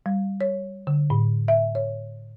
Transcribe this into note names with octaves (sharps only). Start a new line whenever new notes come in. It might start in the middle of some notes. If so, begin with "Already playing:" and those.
G3
C#5
D3
A2
E5
C#5